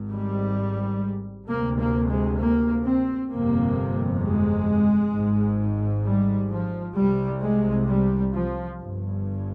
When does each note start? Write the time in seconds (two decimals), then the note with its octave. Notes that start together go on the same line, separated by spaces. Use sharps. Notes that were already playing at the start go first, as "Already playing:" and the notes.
Already playing: G#1 G#2
0.11 G3
1.47 D2 C3 A#3
1.79 A#3
2.09 G#3
2.39 A#3
2.84 C4
3.31 G1 F2 C3 A#3
4.22 G#3
5.13 G#1 G#2
6.05 G3
6.51 F3
6.95 C2 C3 G3
7.41 G#3
7.88 G3
8.33 F3
8.79 G1 G2